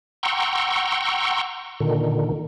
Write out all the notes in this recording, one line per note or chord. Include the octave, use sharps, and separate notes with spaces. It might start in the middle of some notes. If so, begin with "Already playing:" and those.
F#5 G5 A#5 C6 C#6 E6
A#2 D3 D#3